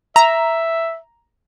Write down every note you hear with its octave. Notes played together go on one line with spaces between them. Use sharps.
E5 A#5